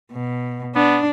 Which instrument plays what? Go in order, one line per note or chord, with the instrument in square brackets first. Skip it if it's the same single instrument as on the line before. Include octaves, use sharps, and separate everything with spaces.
[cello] B2
[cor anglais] B3 [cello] D4